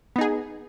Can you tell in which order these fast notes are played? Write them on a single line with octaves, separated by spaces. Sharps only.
B3 D#4 G#4